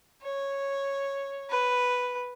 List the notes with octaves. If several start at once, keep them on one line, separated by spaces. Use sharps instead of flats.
C#5
B4